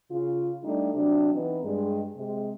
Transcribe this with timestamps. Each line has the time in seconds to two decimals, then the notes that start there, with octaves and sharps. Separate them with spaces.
0.11 C#3 F4
0.63 G3 A3 D4 D#4
0.93 C3 F#3 D4
1.33 E3 B3 C4 D#4
1.63 G2 G#3
2.16 C3 G#3